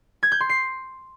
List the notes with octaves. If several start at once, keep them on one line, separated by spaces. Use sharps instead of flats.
G#6
G6
C6
C7